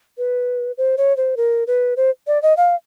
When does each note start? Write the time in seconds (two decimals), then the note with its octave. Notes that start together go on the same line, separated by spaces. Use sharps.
0.18 B4
0.78 C5
0.97 C#5
1.17 C5
1.37 A#4
1.67 B4
1.97 C5
2.27 D5
2.42 D#5
2.57 F5